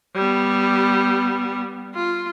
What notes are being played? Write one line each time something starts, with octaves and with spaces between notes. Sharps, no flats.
G3 B3
F4